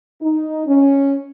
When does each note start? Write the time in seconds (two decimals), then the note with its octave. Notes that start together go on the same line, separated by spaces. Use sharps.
0.21 D#4
0.67 C#4